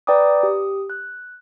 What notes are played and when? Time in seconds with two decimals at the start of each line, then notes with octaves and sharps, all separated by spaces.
0.07 B4 D5 G5 A#5 D6 D#6
0.43 G4 D#6
0.90 F#6